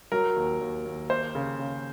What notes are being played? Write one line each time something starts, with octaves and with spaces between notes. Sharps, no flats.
F#3 A#4
D#2
D#2
D#2
A#3 C5
C#3
C#3